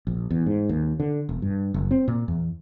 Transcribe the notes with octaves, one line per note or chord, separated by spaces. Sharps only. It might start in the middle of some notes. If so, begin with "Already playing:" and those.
A#1
E2
G#2
D#2
D3
E1
G2
F#1
C4
A#2
E2